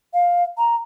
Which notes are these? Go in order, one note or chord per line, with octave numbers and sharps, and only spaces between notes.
F5
A#5